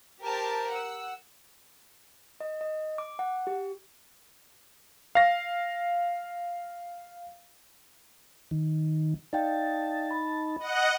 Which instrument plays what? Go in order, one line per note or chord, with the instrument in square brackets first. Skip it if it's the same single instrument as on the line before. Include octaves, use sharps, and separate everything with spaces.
[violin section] G4 A#4 C5 A5
F#5 E6
[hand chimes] D#5
D#5
D6
F#5
G4
[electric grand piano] F5 A#6
[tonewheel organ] D#3
[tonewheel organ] D#4 A5 [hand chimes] D5 F5 G5
[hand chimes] B5
[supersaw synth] D#5 F#5